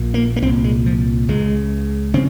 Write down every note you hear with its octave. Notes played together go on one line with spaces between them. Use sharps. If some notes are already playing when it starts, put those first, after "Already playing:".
Already playing: A#1 A#2
A#3
A#3
C2 A#2 C4
G#3
F3
C#2 C#3 G#3
C#3 C4